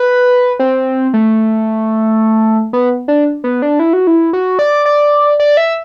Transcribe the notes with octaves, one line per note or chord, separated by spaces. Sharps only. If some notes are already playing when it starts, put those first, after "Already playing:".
Already playing: B4
C4
A3
B3
D4
B3
D4
E4
F#4
E4
F#4
D5
D5
D5
E5